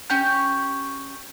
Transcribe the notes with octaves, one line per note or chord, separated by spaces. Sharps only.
C#4 G4 G6